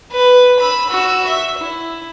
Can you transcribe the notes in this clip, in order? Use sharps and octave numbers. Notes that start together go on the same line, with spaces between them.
B4
B5 E6
F#4 E6
E5
E4